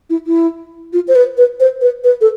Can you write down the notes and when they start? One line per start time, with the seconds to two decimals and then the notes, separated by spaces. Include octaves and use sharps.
0.10 E4
0.27 E4
0.93 F4
1.08 C5
1.15 B4
1.37 B4
1.60 C5
1.81 B4
2.04 B4
2.21 A4